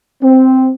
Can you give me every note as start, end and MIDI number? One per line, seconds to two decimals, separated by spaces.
0.23 0.71 60